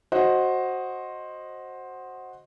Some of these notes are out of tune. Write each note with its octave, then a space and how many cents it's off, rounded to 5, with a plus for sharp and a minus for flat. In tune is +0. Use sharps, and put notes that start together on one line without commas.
F#4 +0 C5 +10 D#5 +0